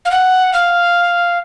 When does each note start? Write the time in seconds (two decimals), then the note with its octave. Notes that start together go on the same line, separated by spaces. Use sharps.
0.05 F5
0.11 F#5
0.53 F5